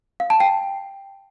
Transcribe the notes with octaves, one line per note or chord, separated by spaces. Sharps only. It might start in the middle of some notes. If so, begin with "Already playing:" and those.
F5
A5
G5